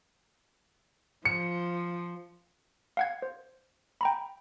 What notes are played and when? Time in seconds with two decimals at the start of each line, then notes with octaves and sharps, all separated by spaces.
1.25 F3 C#7
2.97 F5 F#5 G#6
3.22 C5
4.01 G5 A#5 B5